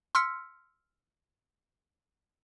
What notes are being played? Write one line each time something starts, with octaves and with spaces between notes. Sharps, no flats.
C6 E6 F6 B6 C#7